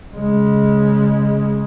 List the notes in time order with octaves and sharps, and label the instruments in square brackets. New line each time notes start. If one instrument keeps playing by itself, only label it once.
[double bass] C#3 G#3